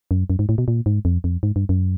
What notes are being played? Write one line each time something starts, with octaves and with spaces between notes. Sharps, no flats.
F#2
F#2
G#2
A2
B2
A#2
G#2
F2
F2
G#2
G2
F#2